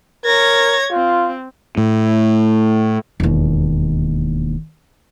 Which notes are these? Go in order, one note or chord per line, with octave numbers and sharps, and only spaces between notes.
A#4 C#5 G#6 A#6
C4 F4
A2
E1 D#2